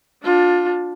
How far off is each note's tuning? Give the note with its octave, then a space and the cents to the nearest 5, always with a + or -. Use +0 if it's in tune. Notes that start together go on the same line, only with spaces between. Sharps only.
D4 +0 F4 +25